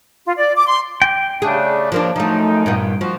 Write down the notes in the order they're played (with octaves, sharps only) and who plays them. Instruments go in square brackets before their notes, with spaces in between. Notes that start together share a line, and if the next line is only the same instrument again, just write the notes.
[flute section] F4
D5
D6
C6
[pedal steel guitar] G5
[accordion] C#3 A3 D4 [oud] G#4
[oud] F3 A#3 D4
[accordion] F#2 D#4 [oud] F3 A3
[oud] G2 A#2 B3
[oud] F3 [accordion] F#4